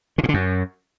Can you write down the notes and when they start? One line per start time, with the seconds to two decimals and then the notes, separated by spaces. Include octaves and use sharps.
0.18 D3
0.23 A#2
0.29 D3
0.34 F#2